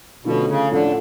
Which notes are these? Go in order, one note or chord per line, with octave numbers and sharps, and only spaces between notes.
B2 D3 F3 A3 C#4
C#3
A2 D3 F3 A3 C#4